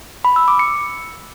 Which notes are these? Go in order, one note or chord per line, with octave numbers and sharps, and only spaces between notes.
B5
E6
D6
C#7